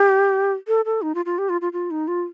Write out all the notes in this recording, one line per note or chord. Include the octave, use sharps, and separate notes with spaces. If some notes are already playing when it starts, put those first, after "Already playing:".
Already playing: G4
A4
A4
D#4
F4
F4
G4
F4
F4
F4
D#4
F4